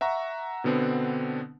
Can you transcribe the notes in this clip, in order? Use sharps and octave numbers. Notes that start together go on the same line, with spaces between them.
E5 F#5 A#5 C#6
B2 D3 B3 C4 D4